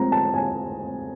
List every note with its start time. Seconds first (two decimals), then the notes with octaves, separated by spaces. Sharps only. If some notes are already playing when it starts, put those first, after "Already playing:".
Already playing: F3 G#3 C4 A#5
0.12 A5
0.34 G#5